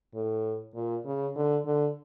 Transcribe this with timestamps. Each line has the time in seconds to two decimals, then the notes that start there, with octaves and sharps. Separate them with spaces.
0.14 A2
0.74 A#2
1.05 C#3
1.35 D3
1.65 D3